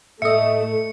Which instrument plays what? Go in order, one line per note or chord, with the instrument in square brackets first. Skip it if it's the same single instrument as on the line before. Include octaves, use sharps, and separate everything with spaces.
[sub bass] A2 [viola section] A3 [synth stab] D#5 E5 [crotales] C#7